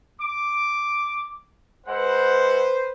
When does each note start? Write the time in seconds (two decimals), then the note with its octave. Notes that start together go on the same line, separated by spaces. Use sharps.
0.21 D6
1.87 G#3 E4 B4 C5 F#5